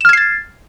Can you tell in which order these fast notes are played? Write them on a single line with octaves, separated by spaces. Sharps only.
E7 F6 G#6 C7 A6